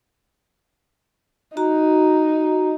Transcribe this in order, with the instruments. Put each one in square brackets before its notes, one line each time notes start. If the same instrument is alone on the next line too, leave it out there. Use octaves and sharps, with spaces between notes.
[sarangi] D#4 [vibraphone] F#4 A#5